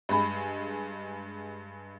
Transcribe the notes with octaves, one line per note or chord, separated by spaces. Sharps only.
G2 G#3 E5 B5